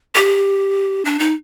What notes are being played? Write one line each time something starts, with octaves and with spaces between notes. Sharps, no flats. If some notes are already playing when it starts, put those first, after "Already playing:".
G4
D4
D#4